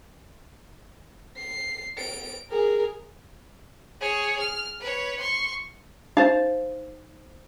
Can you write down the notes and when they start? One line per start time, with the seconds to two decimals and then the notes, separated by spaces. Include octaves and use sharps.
1.38 C7
1.98 D7
2.50 G#4 A#4
4.01 G#4 C#5
4.40 F6
4.80 B4 C#5
5.20 C6 C#6
6.17 D#4 C5 F5